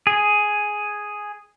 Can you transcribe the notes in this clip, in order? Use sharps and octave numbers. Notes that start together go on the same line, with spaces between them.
G#4